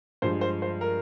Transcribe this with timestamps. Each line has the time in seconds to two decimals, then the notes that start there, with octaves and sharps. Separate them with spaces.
0.22 G2 F3 G#3 C5
0.41 C5
0.62 C5
0.81 A#4